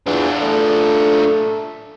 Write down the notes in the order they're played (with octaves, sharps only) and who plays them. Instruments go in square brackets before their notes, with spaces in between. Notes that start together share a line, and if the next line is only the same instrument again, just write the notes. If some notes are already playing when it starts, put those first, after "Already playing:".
[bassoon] E2 [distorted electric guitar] D4 F4
[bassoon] A3